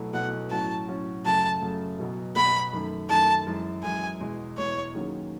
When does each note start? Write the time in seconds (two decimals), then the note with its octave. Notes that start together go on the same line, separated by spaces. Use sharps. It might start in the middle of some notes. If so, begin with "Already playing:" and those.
Already playing: B1 B2 F#3 A3 E4
0.13 B1 B2 F#3 A3 E4 F#5
0.51 A2 F#3 C#4 F#4 A5
0.88 A2 F#3 C#4 F#4
1.25 F#2 C#3 F#3 A3 A5
1.62 F#2 C#3 F#3 A3
1.99 B1 B2 F#3 B3
2.36 B1 B2 F#3 B3 B5
2.73 F#2 D#3 A3
3.09 F#2 D#3 A3 A5
3.47 F#2 E3 G#3
3.84 F#2 E3 G#3 G#5
4.20 E2 B2 G#3
4.57 E2 B2 G#3 C#5
4.94 D#2 D#3 F#3 C#4 G#4